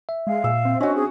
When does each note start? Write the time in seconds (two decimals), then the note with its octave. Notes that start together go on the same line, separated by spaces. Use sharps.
0.09 E5
0.27 G#3 F5
0.44 A#2 E5
0.65 C4
0.81 C#4 D4 F#4 D#5
0.96 G#4